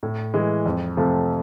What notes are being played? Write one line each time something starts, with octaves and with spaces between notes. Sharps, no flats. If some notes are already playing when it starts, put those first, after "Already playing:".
A2
E3 G#3
F2
C3 F3 A3